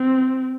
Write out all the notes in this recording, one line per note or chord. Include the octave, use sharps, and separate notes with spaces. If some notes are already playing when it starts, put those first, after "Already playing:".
Already playing: C4